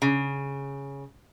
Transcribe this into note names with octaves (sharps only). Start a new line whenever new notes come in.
C#3